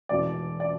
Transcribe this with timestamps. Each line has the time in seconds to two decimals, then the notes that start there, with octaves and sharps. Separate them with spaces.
0.09 E1 E2 B2 D5
0.60 D5